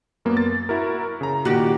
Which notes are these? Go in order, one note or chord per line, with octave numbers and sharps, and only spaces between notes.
F#2 A#3 B3
A6
E4 F#4 A#4
C#3 A#5
A#2 D#3 F#4 G4